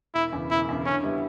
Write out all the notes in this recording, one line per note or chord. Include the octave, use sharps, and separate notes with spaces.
E1 E4
E2 C#3
E1 E4
E2 C#3
D3 C#4
G3 B3 E4